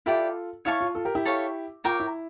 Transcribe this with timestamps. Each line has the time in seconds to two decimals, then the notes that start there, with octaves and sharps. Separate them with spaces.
0.06 E4 F4 G4 A4 D5 G5
0.65 E4 C#5 F5 A5 C#6
0.81 F4
0.95 F4 A4
1.05 G4 A#4
1.15 E4 G4
1.25 A4 C#5 F5 C#6
1.84 F4 A#4 C#5 G5 D6
2.00 E4